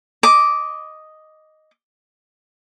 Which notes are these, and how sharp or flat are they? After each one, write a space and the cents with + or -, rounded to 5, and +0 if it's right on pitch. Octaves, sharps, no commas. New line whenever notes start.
D#5 +0 D6 -10